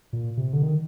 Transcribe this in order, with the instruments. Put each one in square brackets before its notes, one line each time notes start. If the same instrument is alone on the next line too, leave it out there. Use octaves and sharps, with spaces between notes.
[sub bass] A#2
C3
D3
D#3